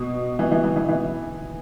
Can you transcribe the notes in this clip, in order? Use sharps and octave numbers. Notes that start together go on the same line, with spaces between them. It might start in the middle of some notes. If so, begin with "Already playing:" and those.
Already playing: B2
E3
E3
E3
E3
E3